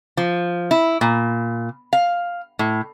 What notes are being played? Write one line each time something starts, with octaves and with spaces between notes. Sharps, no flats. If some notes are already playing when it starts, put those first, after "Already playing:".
F3
E4
A#2
F5
A2